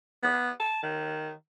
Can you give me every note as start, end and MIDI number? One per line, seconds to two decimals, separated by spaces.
0.23 0.50 59
0.60 0.79 81
0.83 1.32 51